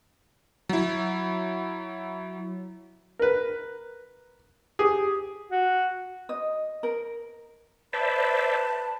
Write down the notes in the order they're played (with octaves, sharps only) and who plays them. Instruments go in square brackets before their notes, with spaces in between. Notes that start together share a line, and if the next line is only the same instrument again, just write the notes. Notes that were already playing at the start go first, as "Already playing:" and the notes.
[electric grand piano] F#3 E4
[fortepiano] A#4 B4
G4 G#4
[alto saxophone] F#4
[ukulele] D#5
A#4
[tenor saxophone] B4 [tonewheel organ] C5 D5 E5 [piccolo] A5